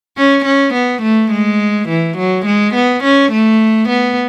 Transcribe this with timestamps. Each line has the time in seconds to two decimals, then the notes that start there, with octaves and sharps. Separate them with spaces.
0.17 C#4
0.45 C#4
0.74 B3
1.02 A3
1.31 G#3
1.88 E3
2.17 F#3
2.45 G#3
2.74 B3
3.04 C#4
3.32 A3
3.88 B3